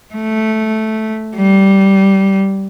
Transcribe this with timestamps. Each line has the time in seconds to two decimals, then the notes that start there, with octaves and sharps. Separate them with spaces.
0.15 A3
1.36 G3